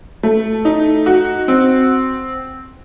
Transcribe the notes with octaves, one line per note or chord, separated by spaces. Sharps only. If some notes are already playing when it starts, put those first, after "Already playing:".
A3
D#4
F#4
C4